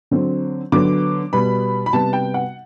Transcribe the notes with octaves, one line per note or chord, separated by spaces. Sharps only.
D3 F#3 C4
D3 F#3 B3 D6
B2 G3 B3 B5
B5
C3 G3 B3 A5
G5
F#5